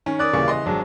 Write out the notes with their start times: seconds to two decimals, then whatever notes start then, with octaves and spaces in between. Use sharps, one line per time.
0.06 D#3 C#4
0.19 A#4 D5 D#6 F#6
0.33 D#1 C#3 E3 A#3 C#6
0.48 D#5 C6
0.66 G#1 F#3 G#3 D4